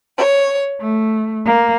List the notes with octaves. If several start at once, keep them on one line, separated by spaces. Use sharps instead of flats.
C#5
A3
A#3